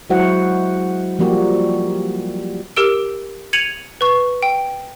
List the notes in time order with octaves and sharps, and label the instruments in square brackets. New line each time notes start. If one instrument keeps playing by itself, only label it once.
[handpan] F#3 G#3 E4 F#4 C5 F#5
F3 G3 A#3 F#4 G4
[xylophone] G4 A#4 E6 D7
G#6 C#7 D#7 F7 F#7
B4 C#6
G5